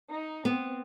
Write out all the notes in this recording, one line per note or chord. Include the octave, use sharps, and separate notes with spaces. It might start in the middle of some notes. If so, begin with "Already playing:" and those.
D#4
B3 C4